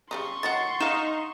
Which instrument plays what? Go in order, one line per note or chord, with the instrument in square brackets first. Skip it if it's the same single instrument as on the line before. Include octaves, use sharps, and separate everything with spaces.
[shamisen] C#3 G3 D#4 [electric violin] C6 C#6
[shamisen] D#3 F#3 F#4 [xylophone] F#5 A6
[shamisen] D4 F5 [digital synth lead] D#4 [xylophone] E7